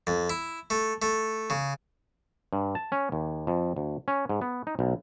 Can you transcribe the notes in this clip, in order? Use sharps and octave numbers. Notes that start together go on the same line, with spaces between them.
F2
E4
A3
A3
C#3
G2
A5
C#4
D#2
F2
D2
C#4
G#2
B3
D#4
B1